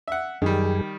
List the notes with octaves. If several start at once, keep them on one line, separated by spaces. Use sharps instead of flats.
E5 F#5
F#2 D#3 G3 G#4